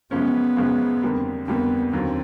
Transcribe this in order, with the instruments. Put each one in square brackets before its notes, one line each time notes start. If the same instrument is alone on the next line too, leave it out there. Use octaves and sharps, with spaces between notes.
[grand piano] F#2 C#3 F3 G#3 C#4 [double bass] B3
[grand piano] F#2 C#3 F3 G#3 C#4
F2 D3 G3 A#3
[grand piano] F2 D3 G3 A#3 [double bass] B3
[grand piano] D#2 D3 F#3 [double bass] C4